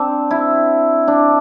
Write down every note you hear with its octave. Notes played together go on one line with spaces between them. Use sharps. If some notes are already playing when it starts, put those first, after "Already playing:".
Already playing: C4 D4
E4
D4